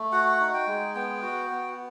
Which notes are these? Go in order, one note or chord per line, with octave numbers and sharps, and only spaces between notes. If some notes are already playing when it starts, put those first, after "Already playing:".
Already playing: A3
F#4 F#5
D#4
G5
G#3
B3 G5
F#4
B3